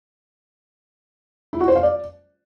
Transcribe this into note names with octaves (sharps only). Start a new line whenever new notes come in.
E4
F#4
C5
F5
D5